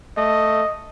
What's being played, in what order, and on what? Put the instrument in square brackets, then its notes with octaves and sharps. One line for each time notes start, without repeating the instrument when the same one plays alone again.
[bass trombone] A3 [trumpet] D#5